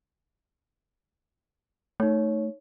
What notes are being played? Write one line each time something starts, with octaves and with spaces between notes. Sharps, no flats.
A3 D#4 C#5